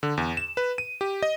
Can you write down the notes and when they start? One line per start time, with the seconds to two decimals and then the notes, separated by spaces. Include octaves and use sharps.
0.03 D3
0.17 E2
0.37 E7
0.57 B4
0.78 D#7
1.01 G4
1.22 D#5